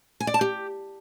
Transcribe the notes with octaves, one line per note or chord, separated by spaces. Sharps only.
G#5
D5
A5
G4